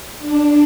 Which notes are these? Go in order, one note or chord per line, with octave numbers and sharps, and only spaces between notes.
D4